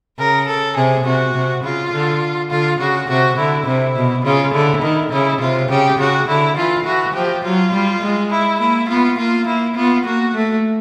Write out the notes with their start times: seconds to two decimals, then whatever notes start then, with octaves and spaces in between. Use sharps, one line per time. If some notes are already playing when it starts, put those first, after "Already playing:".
0.19 C#3 A#4
0.47 A4
0.76 C3 G#4
1.05 C3 F#4
1.34 C3
1.63 C#3 F4
1.93 D3
2.51 D3 F4
2.79 C#3 F#4
3.09 C3 F#4
3.37 D3 E4
3.67 C3 E4
3.96 B2
4.24 C#3 F4
4.54 D3 E4
4.83 D#3
5.11 C#3 E4
5.41 C3 F4
5.70 C#3 G4
6.00 C#3 F#4
6.28 D3 E4
6.57 E3 F4
6.86 E3 F#4
7.15 F3 G4
7.44 F#3 F4
7.73 G3
8.02 G#3
8.31 E4
8.60 A#3 E4
8.89 B3 F4
9.18 A#3 F4
9.47 A#3 E4
9.76 B3 F4
10.06 A#3 F#4
10.35 A3